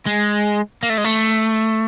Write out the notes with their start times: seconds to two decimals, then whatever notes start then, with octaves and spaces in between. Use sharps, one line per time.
0.06 G#3
0.83 A#3
0.90 A3
0.98 G#3
1.05 A3